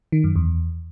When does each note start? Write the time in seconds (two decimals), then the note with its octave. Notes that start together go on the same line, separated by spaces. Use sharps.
0.12 D#3
0.24 F#2
0.36 E2